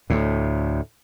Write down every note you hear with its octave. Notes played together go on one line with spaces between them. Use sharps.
D2 A2